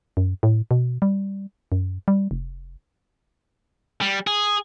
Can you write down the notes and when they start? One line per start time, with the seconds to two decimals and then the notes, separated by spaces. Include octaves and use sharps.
0.17 F#2
0.43 A2
0.71 B2
1.02 G3
1.72 F#2
2.08 G3
2.31 F1
4.01 G3
4.27 G#4